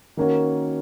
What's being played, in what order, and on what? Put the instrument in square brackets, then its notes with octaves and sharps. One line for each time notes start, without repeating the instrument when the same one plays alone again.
[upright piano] D#3 A#3 C#4 F#4